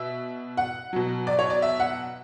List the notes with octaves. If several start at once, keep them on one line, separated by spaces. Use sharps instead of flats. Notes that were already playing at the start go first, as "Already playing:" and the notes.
Already playing: B2 E5
F#5
B2 F#3
D5
C#5
D5
E5
F#5